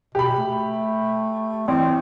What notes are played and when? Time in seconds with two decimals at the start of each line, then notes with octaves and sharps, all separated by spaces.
0.15 B2 G4 B5
0.38 A3
1.68 A1 C4